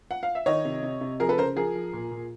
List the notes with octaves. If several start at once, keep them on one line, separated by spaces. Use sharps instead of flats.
F#5
F5
E5
D#3 C#5 D#5
C3
C3
C3
F3 G#4 A#4
A4 B4
C#3 A#4 C5
F3 G#4 A#4
F3
A#2
A#2